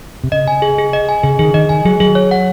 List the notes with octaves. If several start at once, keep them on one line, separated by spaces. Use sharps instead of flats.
C3
C#3 D#5
G#5
G#4
G#4
D#5
G#5
C#3 G#4
D#3 G#4
D#3 D#5
D#3 G#5
F#3 G#4
F#3 G#4
C#5
F#5